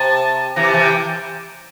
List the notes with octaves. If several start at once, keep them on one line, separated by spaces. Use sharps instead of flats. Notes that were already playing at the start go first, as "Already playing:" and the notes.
Already playing: C3 A5
C3 E3 A#5
C3 E3 A5
G5